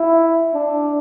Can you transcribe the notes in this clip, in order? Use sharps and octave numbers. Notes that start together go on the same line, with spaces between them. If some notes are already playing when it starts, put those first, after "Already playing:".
Already playing: E4
D4